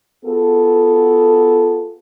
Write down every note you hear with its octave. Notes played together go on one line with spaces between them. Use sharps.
B3 F4 F#4 G#4 A4